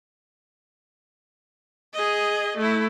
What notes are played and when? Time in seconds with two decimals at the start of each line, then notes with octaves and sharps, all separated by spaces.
1.94 G#4 D#5
2.57 A3 E4